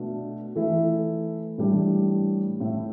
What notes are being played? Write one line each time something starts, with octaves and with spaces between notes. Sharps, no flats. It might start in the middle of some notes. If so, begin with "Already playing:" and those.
Already playing: B2 A3 D4
E3 A3 E4 A4
A2 E3 G3 D4
A2 A3 E4